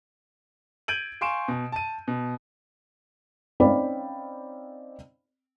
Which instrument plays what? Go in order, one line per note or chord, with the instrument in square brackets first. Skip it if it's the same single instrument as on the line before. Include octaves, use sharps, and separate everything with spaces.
[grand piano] G6 G#6 D7 D#7 F#7
F5 G#5 C6 C#6 D7 E7
B2
A5 D#7
B2
[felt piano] C4 C#4 D#4 D5 F5 B5